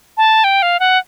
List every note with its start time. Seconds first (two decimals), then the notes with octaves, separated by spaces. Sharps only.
0.17 A5
0.44 G5
0.62 F5
0.80 F#5